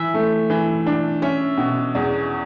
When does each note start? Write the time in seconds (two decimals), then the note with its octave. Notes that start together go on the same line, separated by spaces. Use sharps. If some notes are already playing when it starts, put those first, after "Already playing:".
Already playing: E3 E5
0.14 A3
0.50 E3
0.86 D4
1.22 C#4 E5
1.57 B2
1.95 E2